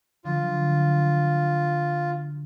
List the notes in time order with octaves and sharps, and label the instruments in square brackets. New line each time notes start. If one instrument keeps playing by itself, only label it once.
[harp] D3 F3 F#3 [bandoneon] F4